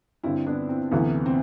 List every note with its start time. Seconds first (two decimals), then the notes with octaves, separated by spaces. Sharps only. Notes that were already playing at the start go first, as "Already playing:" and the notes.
0.24 G2 D3 C4 E4
0.46 B3 D4
0.69 C4
0.91 D2 C3 E3 B3
1.26 C4